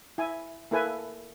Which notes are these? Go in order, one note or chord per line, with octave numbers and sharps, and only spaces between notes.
E4 G#5
A#3 E4 A4 B4 G#5